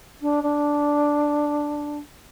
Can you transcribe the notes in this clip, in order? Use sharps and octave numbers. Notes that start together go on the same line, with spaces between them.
D4
D4